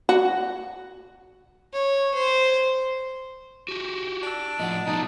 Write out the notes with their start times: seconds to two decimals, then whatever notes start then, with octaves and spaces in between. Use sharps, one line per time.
0.09 F#4
1.73 C#5
2.14 C5
3.68 F#4 G4
4.23 D4 A5 E6
4.60 A2 F3 D#5 F#5
4.87 B2 F3 G3 D#4 A5